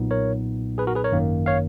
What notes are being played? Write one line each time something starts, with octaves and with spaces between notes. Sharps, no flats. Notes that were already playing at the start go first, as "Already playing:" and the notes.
Already playing: B1 A#2 F#3 B3 D#4
A#4 C#5
G#4 B4
F#4 A#4
G#4 B4
A#4 C#5
G#1 F#2 D#3 A#3
C#5 F5